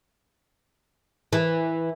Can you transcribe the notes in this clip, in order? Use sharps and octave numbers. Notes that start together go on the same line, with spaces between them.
E3